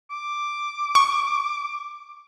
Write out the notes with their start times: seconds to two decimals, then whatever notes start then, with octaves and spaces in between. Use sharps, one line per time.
0.10 D6
0.95 C#6